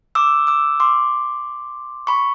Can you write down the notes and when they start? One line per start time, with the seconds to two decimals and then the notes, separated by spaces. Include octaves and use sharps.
0.15 D6 E6
0.47 D6 E6
0.80 C6 D6
2.07 B5 C#6